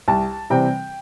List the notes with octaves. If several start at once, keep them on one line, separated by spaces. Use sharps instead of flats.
C2 A5
C3 E3 G3 C4 G5